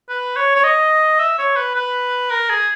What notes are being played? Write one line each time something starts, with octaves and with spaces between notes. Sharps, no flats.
B4
C#5
C#5
D#5
E5
C#5
B4
B4
A#4
G#4